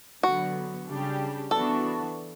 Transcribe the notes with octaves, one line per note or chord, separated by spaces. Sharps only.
D3 F#3 B3 F#4
C#3 G3 D4 G4
E3 B3 D4 F#4 A4